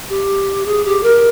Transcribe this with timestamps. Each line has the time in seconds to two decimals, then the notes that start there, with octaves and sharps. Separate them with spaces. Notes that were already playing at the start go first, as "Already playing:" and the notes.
0.09 G4
0.66 G#4
0.85 G4
1.03 A#4